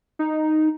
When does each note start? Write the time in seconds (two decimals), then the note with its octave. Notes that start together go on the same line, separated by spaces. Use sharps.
0.19 D#4